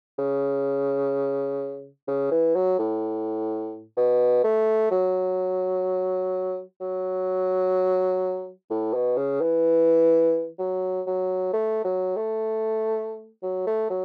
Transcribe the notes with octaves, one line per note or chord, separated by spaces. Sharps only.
C#3
C#3
E3
F#3
A2
B2
A3
F#3
F#3
A2
B2
C#3
E3
F#3
F#3
A3
F#3
A3
F#3
A3
F#3